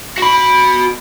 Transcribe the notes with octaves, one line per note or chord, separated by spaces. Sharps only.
F#4 B5